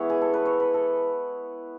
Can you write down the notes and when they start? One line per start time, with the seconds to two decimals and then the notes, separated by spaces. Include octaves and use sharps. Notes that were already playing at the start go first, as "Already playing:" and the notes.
Already playing: E3 G#3 B3 E4 C#5
0.10 G#4
0.21 A4
0.34 B4
0.45 C#5
0.60 B4
0.74 A4